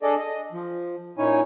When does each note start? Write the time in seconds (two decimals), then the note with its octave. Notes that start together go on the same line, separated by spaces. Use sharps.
0.03 D4 G#4 A4 D5 D#5
0.18 D#5
0.52 F3
1.18 A#2 C#4 D#4 E4 C#5 G#5